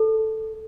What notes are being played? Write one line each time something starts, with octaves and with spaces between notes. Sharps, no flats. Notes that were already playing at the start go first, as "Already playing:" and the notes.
Already playing: A4